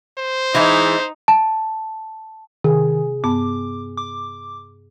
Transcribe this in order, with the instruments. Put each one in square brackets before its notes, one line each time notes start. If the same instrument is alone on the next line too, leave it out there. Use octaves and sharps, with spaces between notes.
[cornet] C5
[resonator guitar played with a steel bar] E3 G#3 E4 [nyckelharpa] D#4
[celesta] A5
[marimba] C3 [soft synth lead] D#3 [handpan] G#4
[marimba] G2 B3 A5 [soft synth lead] D6
[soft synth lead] D6